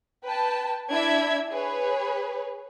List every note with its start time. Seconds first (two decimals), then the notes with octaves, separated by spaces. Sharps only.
0.24 B4 G5 A5
0.92 D4 E4 E5 G#6
1.50 G#4 B4 C#5